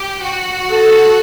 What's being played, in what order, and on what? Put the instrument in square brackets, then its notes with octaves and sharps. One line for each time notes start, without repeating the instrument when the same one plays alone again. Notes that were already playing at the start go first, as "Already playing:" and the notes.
Already playing: [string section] G4
F#4
[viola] A4